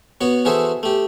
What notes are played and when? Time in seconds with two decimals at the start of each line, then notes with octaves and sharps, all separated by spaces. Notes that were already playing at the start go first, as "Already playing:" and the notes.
0.21 B3 F#4 C#5
0.45 E3 F#4 G#4 A4 C5 E5
0.83 A3 G4